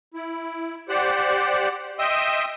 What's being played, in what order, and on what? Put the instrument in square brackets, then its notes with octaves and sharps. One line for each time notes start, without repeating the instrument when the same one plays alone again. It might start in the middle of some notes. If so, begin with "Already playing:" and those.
[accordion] E4
G4 C5 D5 F#5
D#5 E5 G5 C6 D#6 E6